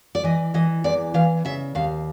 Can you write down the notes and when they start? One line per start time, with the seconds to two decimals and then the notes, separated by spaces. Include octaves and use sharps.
0.15 D5
0.24 E3 D#5
0.54 E3 D#5
0.84 E2 D5
1.14 E3 F5
1.45 C#3 E5
1.75 D#2 F5